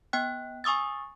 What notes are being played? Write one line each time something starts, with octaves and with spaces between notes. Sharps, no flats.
B3 G5 F#6
G#5 C#6 D#6 E6 A6